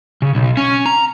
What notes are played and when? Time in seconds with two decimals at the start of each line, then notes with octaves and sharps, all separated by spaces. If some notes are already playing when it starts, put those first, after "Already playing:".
0.22 C#3
0.35 B1
0.57 C#4
0.86 A#5